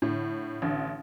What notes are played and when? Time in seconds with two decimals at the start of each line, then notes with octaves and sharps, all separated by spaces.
0.02 A2 D3
0.62 A1 D3